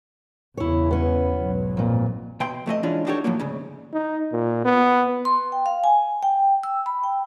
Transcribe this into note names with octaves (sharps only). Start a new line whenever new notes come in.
E2 C#3 E4 C#5
B3 C#4
B1 G#2 F#3
F2 A#2
B2 G5 C6
F2 A3 G#4 D#5
E3 G#3 C#4 D4 F4
D4 D#4 F#4 G4 A4 C#5
A2 F3 F#3 A#3
D2 G#2 C#3
D#4
A#2
B3
C6
G5
F5
G#5
G5
E6
B5
G5